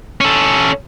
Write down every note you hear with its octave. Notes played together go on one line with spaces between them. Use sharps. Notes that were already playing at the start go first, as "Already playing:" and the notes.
C#4 A4